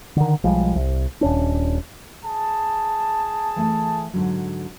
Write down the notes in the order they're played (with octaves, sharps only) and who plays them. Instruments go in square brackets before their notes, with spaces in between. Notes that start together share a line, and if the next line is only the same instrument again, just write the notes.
[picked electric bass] D3 D#3
B1 F3 G3 G#3
C2
D#1 C#4 D4
[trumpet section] G#4 A5
[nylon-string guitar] E3 A3 G#5
G#2 D3 F#3